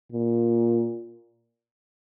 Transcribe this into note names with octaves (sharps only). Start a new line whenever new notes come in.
A#2